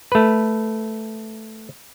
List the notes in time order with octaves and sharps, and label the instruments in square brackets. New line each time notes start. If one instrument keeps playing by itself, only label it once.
[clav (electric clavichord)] A3 B4